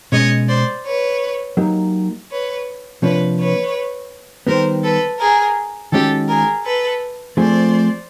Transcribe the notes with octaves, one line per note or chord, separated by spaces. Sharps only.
B2 G#3 C#4 C#5 D#5
C5 D5
B4 C#5
F#3 A#3 D#4 G4 A#4
B4 C#5
C3 F3 A#3 D4 B4 C#5
B4 C#5
D#3 G3 B3 A#4 C5
A4 B4
G#4 A#4
D#3 G#3 C#4 F#4 G4 A4
G#4 A#4
A4 B4
F3 A3 C4 F4 G#4 C5 D5